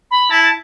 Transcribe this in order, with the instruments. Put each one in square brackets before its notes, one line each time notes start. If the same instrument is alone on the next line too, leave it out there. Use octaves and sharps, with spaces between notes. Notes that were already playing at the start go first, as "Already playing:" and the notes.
[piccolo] B5
[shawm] E4 [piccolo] A5
[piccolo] A5